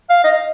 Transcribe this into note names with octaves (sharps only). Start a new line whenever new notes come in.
F5
D#5